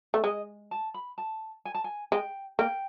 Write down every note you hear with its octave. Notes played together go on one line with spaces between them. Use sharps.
A3
G#3 D#5
A5
B5
A5
G#5
A5
G#5
G#3 G5
A#3 G5